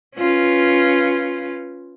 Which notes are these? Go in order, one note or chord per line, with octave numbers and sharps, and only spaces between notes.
C#4 F4 B4